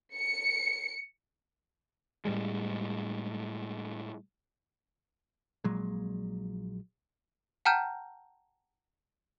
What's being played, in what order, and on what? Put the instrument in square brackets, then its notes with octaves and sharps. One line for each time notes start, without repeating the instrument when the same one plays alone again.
[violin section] C#7
[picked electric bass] A2 G3 G#3
A#1 A#2 F#3 G#3
[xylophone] F#5 G5 A5 A#5 F6 G6